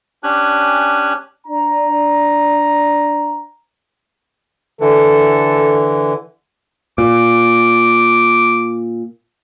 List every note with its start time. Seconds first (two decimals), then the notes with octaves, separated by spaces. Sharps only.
0.23 C#4 D4 G4 G#5 F#6
1.47 D4 A#5
4.81 D3 E3 A4
6.98 A#2 D6